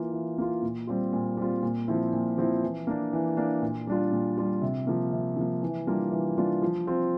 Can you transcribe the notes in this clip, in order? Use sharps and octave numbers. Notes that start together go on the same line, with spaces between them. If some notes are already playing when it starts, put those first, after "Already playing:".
Already playing: E3 A#3 F4
E3
A#3 F4
A#2
G3 C4 F4
A#2
G3 C4 F4
A#2
F3 C4 E4
A#2
F3 C4 E4
E3
A#3 D4
E3
A#3 D4
A#2
G3 D4 F4
A#2
G3 D4 F4
C3
F3 A#3
C3
F3 A#3
E3
G3 A#3 D4 F4
E3
G3 A#3 D4 F4
F3
C4 F4